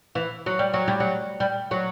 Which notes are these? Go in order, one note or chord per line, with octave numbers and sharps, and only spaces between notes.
E3
F#3
G3
F#3
G3
F#3
G3
F#3